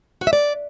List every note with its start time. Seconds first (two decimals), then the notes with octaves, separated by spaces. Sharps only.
0.21 F#4
0.27 E5
0.33 D5